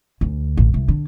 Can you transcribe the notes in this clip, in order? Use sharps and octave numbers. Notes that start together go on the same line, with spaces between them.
D2
A1
C2
D3